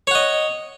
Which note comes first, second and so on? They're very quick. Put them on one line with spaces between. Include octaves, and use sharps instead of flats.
C#5 F#5 D#5